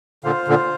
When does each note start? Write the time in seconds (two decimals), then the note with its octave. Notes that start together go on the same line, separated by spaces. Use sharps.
0.24 A#2 D3 F4 C5 F5
0.48 A#2 D3